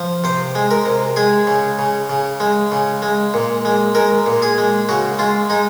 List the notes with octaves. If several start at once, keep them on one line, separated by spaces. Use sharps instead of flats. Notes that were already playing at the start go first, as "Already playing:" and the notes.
Already playing: F3
C3 C5
G#3
A#4
C3
G#3 G#4
C#3
C#3
C#3
G#3
C#3
G#3
A#2
G#3
G#3 A#4
A#2
G#4
G#3
C#3 F#4
G#3 F4
G#3 D#4